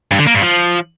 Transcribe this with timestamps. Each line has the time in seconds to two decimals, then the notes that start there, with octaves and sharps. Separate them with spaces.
0.11 G2
0.19 D3
0.27 A#3
0.34 G2
0.42 F3